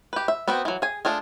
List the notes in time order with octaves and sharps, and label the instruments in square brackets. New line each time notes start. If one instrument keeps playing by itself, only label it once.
[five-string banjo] G4 B4
E5
B3 C4 F#4 B4 G5
E3 F#3
G#4 G#5
A3 D4 F4 G#4